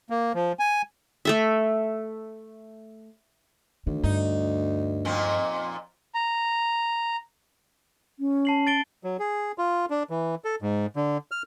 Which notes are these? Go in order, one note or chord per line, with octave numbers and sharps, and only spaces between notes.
A#3
F3
G#5
A3 A4 E5
D2 D#3
G2 D#4
F2 A#2 C4
A#5
C#4
A5 C7 F#7
A6 D7 G7
F#3
G#4
F4
D4
E3
A4
G#2
D3
F6